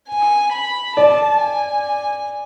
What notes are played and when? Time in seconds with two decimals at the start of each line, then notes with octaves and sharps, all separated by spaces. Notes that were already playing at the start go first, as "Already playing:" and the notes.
0.08 G#5
0.52 B5
0.96 D5 A5
1.41 G#5